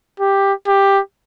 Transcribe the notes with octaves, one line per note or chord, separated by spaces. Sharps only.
G4
G4